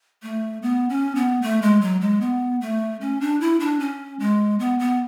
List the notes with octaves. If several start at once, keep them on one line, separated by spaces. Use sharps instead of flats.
A3
B3
C#4
B3
A3
G#3
F#3
G#3
B3
A3
C#4
D4
E4
D4
C#4
G#3
B3
B3